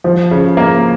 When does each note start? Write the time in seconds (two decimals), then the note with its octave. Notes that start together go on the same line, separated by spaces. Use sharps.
0.04 F3
0.31 C#3
0.57 A#3